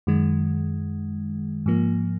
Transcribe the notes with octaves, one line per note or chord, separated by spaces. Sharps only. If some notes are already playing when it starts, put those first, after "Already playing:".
F#2 D#3 G#3
G#2 F3 A#3